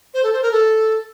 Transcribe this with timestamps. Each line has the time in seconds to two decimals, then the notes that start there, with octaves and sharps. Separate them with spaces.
0.14 C5
0.23 A4
0.33 C5
0.42 A#4
0.51 A4